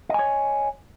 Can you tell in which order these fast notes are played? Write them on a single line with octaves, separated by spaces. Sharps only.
D#5 G#5 C#5